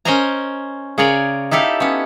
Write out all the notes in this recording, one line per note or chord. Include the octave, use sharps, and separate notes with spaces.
C#4 A#4 C5 D#5 G#5 A#5
C#3 G#4 A#4 C#5 D5
D#4 E4 G4 A4 F5
B3 C#4